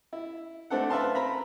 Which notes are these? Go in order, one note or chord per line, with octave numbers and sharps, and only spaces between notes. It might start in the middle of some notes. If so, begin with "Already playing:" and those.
E4
A3 C4 D4 A4 F#5
B4 E5 F5 A5 C6
C4 A#5 B5